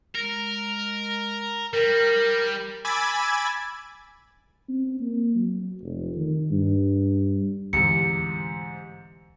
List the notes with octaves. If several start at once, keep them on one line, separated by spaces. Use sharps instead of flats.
G#3 A#4
G3 A#4
G#5 B5 D6 E6 G#6 A6
C4
A#3
F#3
F1
D#3
G2
D2 G#2 C3 E3 C#7